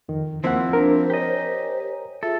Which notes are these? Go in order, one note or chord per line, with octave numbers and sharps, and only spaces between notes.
F2 D#3
D#2 F3 A#3 C4 E4 C5 F#5
D4 A#4
G4 C#5 D#5 G#5 A#5
F4 G#4 A4 E5